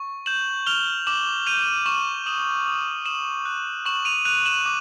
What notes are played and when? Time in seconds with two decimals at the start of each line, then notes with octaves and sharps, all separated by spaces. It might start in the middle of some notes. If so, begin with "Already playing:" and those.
Already playing: C#6
0.26 G6 E7 F#7
0.66 F6 F7 G7
1.07 D6 E7 F#7
1.46 G6 D#7 F7
1.86 C#6 E7 F#7
2.26 D#6 E7 F#7
2.66 D#6
3.05 D#6 E7 F#7
3.45 F#6
3.86 C#6 E7 F#7
4.05 D#7 F7
4.25 F#6 D#7 F7
4.46 E7 F#7
4.65 D6